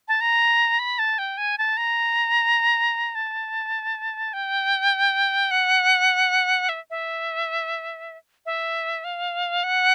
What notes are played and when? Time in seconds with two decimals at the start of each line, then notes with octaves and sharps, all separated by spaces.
0.08 A5
0.21 A#5
0.79 B5
0.99 A5
1.18 G5
1.37 G#5
1.58 A5
1.77 A#5
3.15 A5
4.33 G5
5.51 F#5
6.69 E5
6.90 E5
8.46 E5
9.04 F5
9.63 F#5